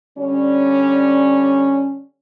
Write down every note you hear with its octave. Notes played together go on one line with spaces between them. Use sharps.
D3 G3 C#4